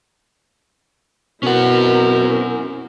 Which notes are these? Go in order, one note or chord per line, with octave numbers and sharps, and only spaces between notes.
B2 C4 C#4 E4 A#4 F#5